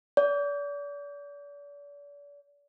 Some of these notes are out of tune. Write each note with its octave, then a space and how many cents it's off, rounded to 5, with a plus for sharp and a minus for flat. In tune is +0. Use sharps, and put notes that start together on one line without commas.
D5 -40